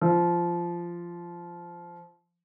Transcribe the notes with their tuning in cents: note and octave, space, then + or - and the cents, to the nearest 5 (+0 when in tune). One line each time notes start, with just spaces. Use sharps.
F3 -15